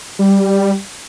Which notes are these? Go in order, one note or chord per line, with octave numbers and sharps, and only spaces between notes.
G3